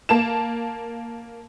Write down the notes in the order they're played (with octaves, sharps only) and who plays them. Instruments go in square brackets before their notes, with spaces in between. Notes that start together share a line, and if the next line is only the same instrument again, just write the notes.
[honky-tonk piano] A#3 A5 E7